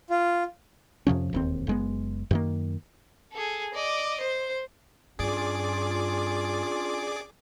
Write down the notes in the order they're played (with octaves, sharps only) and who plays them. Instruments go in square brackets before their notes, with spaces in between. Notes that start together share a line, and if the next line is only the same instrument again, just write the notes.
[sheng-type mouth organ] F4
[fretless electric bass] F2 C3 F3 C#4
E1 D#2 C4
F#1 G#3 B3
F#2 D#3 A#3
[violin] G#4 A4
D5 D#5
C5
[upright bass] G2 [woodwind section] C#4 D4 F4 [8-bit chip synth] G#4 D5 D6